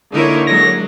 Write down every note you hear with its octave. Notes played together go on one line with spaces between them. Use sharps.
D3 A#3 D#4 E4 A#4 C#5
F#3 G#3 A#6